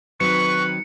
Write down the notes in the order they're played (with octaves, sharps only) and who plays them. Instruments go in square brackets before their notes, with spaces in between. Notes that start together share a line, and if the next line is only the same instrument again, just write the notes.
[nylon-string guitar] D#3 F#3 C4 [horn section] B4 [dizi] C#6 [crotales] C#7